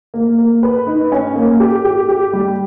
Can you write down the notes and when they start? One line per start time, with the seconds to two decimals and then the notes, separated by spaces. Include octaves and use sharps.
0.14 A#3
0.38 A#3
0.63 B4
0.87 D#4
1.12 C#4
1.36 A#3
1.60 G4
1.84 G4
2.09 G4
2.33 G3